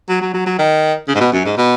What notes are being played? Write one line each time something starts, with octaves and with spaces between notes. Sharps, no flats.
F#3
F#3
F#3
F#3
D#3
C#3
G#2
B2
F#2
G#2
B2